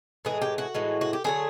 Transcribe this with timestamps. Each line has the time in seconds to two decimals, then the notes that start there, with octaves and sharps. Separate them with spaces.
0.25 A2 E3 G#3 G#4
0.42 G4
0.58 F#4
0.75 A2 E3 G#3
1.01 F#4
1.13 G4
1.24 D3 F#3 A3 G#4